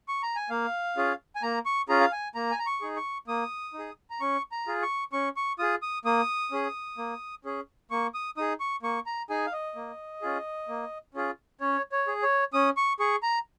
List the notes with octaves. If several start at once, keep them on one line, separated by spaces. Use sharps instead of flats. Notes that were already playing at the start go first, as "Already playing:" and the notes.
C#6
A#5
G#5
A#3 F5
C#4 F4 G#4
G#5
A#3 A#5
C#6
C#4 F4 G#4 A#5
F5
G#5
A#3 A#5
G#5
A#5
C#6
D#4 G#4
C#6
A#3 D#6
D#4
G#4
A#5
C#4 C#6
A#5
F4 G#4
C#6
C#4 C#6
C#6
F4 G#4 D#6
D#6
A#3 D#6
C#4 G#4
A#3
C#4 G#4
A#3 C#6
D#6
D#4 G#4 D#6
C#6
A#3 C#6
A#5
D#4 G#4 G#5
F5
D#5
A#3
C#4 F4 G#4
A#3
C#4 F4 G#4
C#4 C#5
C#5
G#4
C#5
C#4 D#6
C#6
G#4 C#6
A#5